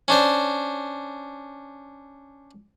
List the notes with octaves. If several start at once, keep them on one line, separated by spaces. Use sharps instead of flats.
C#4 D4 C5